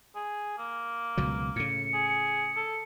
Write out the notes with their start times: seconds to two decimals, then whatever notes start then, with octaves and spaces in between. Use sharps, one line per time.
0.15 G#4
0.58 A#3
1.17 C#2 B2 F#3
1.56 A2 C#3 C#7
1.93 G#4
2.56 A4